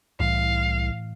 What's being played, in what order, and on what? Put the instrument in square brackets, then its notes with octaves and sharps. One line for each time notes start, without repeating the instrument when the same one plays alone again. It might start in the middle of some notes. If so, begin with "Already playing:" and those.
[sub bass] C2 [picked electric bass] A2 E3 [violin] F5